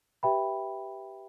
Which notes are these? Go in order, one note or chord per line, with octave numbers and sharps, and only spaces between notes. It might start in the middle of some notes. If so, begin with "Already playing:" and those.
G4 B4 E5 G5 B5